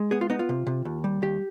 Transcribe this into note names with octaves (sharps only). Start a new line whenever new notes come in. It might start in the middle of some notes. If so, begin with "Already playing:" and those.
Already playing: G#3
B3 G#4
F4
B3 D#4
F4
C3
C3
D#2
G3
D#2 G4